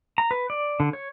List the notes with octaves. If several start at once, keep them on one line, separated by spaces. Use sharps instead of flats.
A#5
B4
D5
D3
C#5